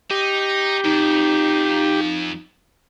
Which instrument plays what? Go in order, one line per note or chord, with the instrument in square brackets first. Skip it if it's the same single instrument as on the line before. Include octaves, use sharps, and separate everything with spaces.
[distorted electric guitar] D#4 [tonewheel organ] G4
[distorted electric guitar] F2 [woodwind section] D#4